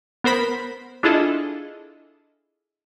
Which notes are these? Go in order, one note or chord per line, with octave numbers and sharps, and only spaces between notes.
B3 A#4 C5 B5 B6
D4 E4 F4 G#4 A4 D#5